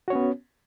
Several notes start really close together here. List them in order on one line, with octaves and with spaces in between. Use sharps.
F#4 C#5 C#4 B3